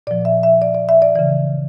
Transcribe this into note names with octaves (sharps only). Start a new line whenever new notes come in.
A#2 F3 D5
E5
E5
D5
D5
E5
D5
C#3 E3 D5